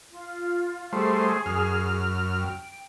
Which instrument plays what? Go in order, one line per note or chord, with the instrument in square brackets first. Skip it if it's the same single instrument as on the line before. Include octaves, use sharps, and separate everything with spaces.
[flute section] F4
[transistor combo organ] G3 A3 C5 [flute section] G#4
[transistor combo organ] F#2 F6
[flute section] G5